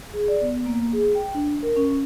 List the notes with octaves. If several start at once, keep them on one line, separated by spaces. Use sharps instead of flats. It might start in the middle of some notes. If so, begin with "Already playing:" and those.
G#4
D5
B3
A#3
G#4
G5
D4
A#4
C#4